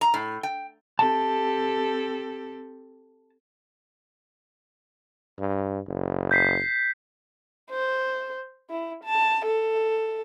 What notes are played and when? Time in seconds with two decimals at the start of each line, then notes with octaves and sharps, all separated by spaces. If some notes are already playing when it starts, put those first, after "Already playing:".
0.01 A#5
0.14 A2
0.43 G5
0.99 C4 G4 A4 A5
5.39 G2
5.87 F#1
6.31 G6 B6 C7
7.71 C5
8.70 E4
9.04 A5
9.45 A4